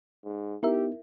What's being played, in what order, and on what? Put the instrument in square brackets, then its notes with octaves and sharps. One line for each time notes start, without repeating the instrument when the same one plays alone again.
[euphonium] G#2
[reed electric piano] B3 D#4 [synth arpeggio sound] E4 A#4 E5 [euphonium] G4